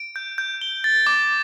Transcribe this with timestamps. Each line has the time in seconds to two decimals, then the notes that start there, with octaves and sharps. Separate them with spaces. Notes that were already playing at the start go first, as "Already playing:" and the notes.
Already playing: D7
0.16 G6
0.38 G6
0.62 G7
0.84 A6
1.07 D6